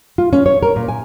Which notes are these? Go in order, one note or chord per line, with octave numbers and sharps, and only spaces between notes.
F4
C#4
C#5
A#4
A#2
G#5